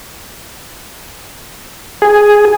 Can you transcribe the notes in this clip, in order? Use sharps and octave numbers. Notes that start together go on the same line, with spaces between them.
G#4